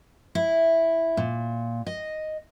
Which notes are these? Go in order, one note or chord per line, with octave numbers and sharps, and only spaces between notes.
E4
A#2
D#5